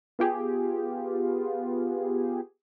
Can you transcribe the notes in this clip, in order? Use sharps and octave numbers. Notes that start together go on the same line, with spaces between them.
B3 F4 G4 G#4